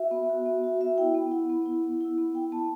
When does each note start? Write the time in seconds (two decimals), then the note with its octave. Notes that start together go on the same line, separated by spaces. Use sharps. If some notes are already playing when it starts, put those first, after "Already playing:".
Already playing: F#4 E5
0.11 B3
0.29 F#4
0.46 B3
0.63 F#4
0.81 B3 E5
0.97 E4 G5
1.15 B3
1.31 E4 F#5
1.50 B3
1.66 E4
1.84 B3
2.01 E4
2.18 B3
2.35 E4 G5
2.52 B3 A5